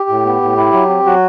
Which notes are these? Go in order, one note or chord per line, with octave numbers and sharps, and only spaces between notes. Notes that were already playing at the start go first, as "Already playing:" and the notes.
Already playing: G4
A2
B3
A2
E4
F#3
C4
F#3 F#4